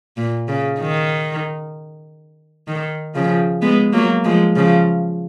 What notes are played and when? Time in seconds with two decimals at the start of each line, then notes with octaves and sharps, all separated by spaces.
0.17 A#2
0.48 C#3
0.80 D#3
2.68 D#3
3.15 C#3 F3
3.62 G#3 B3
3.93 F#3 A#3
4.25 F3 G#3
4.56 C#3 F3